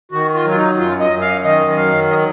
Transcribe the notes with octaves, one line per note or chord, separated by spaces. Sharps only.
D#3 F#4
F4
F#3
F4
D#4
F#2 F4
D#5
F#2
F5
D#3 D#5
D#5
F#3 F5
D#5